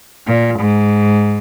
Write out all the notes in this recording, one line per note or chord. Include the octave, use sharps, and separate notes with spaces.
A#2
G#2